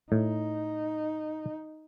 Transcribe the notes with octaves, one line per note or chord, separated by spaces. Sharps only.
A2 D#4